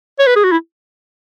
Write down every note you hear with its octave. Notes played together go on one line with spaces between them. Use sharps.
C#5
B4
G#4
F#4
E4